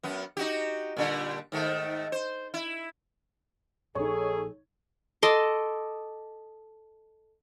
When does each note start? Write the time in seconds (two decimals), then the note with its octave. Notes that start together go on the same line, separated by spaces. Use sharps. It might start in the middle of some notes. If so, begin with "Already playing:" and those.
0.03 F#2 B3
0.37 D#4 F#4 G4
0.97 A#2 D3 G3
1.52 G#2 D#3 A3
2.12 C5
2.54 E4
3.95 A#1 D#4 G#4 A4 C#5
5.22 A4 D#5 C6 D6